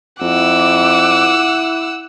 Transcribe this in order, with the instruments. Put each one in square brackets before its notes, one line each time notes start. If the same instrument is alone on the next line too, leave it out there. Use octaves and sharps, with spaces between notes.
[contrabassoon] F2 [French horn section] E4 [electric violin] F#5 E6 [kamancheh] D6